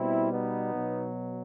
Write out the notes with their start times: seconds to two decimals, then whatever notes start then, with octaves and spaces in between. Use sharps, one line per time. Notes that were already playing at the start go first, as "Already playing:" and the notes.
Already playing: B2 G3 C4 E4
0.32 B3 D#4
0.75 B2 F#3